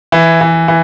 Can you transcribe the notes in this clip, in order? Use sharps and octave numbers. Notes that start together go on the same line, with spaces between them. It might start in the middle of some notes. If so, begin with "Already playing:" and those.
E3
E3
E3